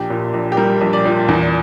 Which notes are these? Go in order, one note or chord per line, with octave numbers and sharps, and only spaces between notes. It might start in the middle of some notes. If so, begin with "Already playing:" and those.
Already playing: A#1 G4
A#2
A#1
G4
G3 A#4
A#1
D5
A#2
E2